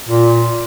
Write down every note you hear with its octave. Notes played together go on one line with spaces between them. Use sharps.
A#2